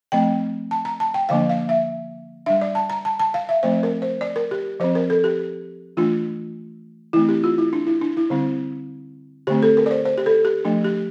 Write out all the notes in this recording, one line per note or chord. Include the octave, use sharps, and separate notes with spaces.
F3 A3 C4 G5
A5
A#5
A5
G5
D3 F3 A#3 D4 F5
F5
E5
G3 D4 E5
D5
A5
A#5
A5
A5
F5
E5
F3 A3 C4 C5
A#4
C5
D5
A#4
G4
F3 C4 C5
A#4
A4
G4
E3 A3 D4 F4
E3 A3 C4 E4
G4
F4
E4
D4
E4
D4
E4
D3 G3 C4
D3 A3 C4 G4
A4
A#4
D5
C5
C5
G4
A4
G4
F3 A3 D4
G4